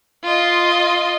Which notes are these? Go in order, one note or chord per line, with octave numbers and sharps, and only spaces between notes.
F4 D#5